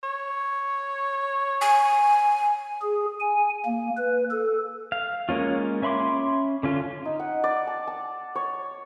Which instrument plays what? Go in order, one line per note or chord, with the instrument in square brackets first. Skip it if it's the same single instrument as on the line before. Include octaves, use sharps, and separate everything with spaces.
[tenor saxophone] C#5
[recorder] G#5
[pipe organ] G#4
G#5
A#3
B4
A4
[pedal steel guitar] F5
G#3 A#3 C#4 F4
C#4 E5 B5 C6 D6
D3 C#4 F4
[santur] D#4
F#5
D5
A5
A5
C#5